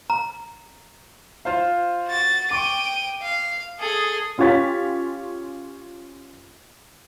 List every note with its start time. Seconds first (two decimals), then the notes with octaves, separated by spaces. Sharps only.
0.10 A#5
1.45 F4 C5 F5
2.07 F#4 A6
2.51 G5 C#6 D6 D#7
3.22 F5
3.79 G#4 A4
4.38 C#4 F4 G4 C#5 A6 B6